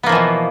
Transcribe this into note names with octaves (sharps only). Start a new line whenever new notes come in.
B2 E3 F3 A#3 B3